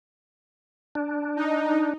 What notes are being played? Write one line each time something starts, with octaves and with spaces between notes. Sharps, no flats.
D4
D#4